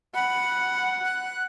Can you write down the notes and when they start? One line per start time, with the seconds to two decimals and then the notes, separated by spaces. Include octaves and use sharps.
0.15 F#5 B5
1.05 F#6